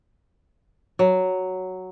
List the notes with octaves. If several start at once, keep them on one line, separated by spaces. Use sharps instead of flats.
F#3